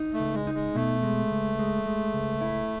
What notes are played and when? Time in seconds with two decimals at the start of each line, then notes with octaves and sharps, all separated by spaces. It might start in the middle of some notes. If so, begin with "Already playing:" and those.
Already playing: D#4
0.13 A3
0.20 C#2
0.34 G#3
0.47 D#4
0.54 G#3
0.75 B2 A3
1.03 G#3
1.31 C#2
1.59 G#3
1.86 G#3
2.13 C#2
2.41 E4